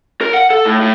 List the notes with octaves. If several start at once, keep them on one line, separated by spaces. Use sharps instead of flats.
A#4
F#5
A4
A2
A2